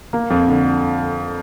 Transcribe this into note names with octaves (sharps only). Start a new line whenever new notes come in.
A#3
F2
D3